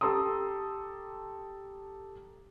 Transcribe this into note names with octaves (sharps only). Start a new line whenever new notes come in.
G4 A4 A#5 C6 D#6